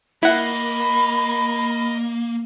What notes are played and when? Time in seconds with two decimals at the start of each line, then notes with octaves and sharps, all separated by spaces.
0.23 A#3 E4 D#5 F#5 B5